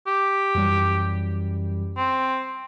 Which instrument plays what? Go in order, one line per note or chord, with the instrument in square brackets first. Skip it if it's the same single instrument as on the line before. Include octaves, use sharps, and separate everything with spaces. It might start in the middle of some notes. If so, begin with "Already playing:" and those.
[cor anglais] G4
[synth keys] F#2 E3 G3
[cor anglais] C4